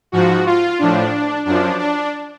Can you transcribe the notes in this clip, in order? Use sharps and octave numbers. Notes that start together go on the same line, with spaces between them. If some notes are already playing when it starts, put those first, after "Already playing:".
G#2 F3 F#4
F4
A2 F3 D4
F#2 F3 D4
D4